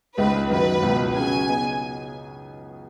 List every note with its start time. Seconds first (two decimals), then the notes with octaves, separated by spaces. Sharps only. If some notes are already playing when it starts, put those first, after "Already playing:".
0.17 C#2 C#3 G#3 D#4 B4
0.50 F#2 D#3 F#3 D#4 B4
0.83 C#2 B2 F#3
1.15 C#3 F#3 C#4 G#5
1.49 C#3 B3 D#4